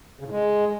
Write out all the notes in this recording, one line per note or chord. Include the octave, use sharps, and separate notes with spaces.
C#3
A2
G#3